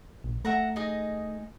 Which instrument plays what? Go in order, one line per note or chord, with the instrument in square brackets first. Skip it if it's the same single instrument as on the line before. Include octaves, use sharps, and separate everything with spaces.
[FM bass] A#1
[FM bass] A3 [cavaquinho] E5 F#5 A#5
[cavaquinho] D#4 G#4 D#5